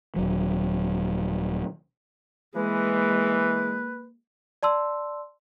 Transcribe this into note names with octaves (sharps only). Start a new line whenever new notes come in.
D#1 C#2 F#3
E3 G#3 A#3 B4
D5 A5 C6 E6